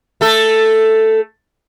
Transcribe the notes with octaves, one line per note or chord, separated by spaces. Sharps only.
A3 A4